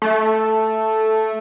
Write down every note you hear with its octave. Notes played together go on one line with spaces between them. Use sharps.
A3